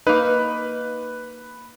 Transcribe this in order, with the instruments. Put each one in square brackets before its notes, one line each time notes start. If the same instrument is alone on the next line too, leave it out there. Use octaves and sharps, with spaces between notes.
[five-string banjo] A#3 D#4 [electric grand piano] B4